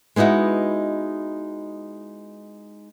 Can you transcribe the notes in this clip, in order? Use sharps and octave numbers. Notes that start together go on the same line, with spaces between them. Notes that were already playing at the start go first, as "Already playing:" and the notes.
G#3 B3 D#4 E4 F#4